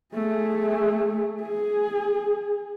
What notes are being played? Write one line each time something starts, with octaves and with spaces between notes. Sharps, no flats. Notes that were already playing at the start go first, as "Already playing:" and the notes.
A3 G#4
G#4